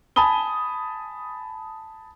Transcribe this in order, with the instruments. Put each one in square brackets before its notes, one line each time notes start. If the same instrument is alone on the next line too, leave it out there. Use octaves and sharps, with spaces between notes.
[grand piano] G#5 A5 B5 D#6 G7